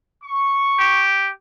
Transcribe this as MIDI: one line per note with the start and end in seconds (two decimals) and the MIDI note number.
0.23 1.02 85
0.80 1.31 67